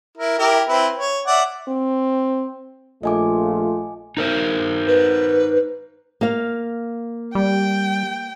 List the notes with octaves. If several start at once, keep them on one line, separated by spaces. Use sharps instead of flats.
E4 A#4
E4 G4 A#4
C4 E4 B4
C#5
D5 E5 F#5
C4
A#1 A3 F4 D#5 G#5 D6
D#4 A#4 C5
B4
A#3 F5
G3 G5